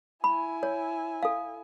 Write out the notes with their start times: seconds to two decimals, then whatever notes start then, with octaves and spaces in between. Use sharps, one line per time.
0.24 E4 G#5 B5
0.63 C#5
1.23 A4 F5